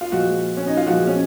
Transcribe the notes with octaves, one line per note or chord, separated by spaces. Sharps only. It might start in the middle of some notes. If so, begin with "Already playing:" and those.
F4
A#2 F3 G#3 F#4
C#4
D#4
F4
A#2 F3 G#3 F#4
C#4